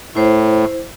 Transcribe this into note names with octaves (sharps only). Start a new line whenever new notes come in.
A2 E4 C5